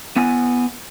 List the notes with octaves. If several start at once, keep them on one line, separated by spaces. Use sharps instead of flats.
B3 F#5 G#5